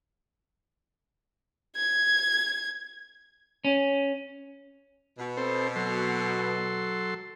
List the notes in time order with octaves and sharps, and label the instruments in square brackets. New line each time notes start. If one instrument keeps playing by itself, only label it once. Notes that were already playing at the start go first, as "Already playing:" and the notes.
[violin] G#6
[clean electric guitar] C#4
[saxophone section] B2
[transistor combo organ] C4 A4 C5
F#3 A4 C6